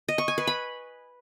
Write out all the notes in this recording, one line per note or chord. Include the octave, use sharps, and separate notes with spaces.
D#5
C#6
G#5
B4
B5